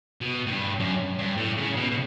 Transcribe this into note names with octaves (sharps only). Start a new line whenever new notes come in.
B2
A2
G2
F#2
G2
A2
C#3
B2
B2